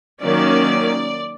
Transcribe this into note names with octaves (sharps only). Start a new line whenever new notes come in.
D#3 F#3 A#3 C#4 D5